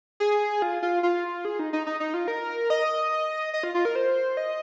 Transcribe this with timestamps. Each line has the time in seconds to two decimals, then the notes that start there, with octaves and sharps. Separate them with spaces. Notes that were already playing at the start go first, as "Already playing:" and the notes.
0.20 G#4
0.62 F4
0.82 F4
1.03 F4
1.45 G#4
1.59 D#4
1.73 D#4
1.87 D#4
2.00 D#4
2.14 F4
2.28 A#4
2.70 D#5
3.54 D#5
3.63 F4
3.74 F4
3.85 A#4
3.95 C5
4.37 D#5